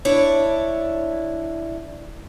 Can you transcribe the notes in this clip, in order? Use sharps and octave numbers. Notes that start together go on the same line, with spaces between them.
D4 E4 C#5